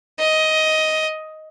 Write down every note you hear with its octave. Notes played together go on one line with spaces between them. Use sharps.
D#5